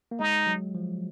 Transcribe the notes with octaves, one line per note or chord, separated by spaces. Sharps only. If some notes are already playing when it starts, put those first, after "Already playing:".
A#3
G#3 D#4
F#3
F3